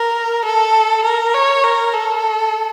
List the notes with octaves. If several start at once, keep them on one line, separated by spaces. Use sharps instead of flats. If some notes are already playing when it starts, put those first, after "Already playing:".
Already playing: A#4
A4
A#4
C#5
A#4
A4